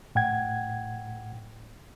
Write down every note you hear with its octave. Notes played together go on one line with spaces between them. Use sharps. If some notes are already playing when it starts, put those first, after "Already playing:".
A2 F#5 G5 G#6